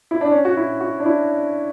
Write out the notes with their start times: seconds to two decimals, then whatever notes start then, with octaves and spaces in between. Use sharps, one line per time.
0.11 E4
0.21 D4
0.31 C#4
0.45 F#4
0.57 E4
0.81 F#4
1.00 D4
1.06 E4